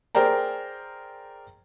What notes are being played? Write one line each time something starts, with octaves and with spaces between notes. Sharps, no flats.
G#4 A#4 C5 D5 G5 A#5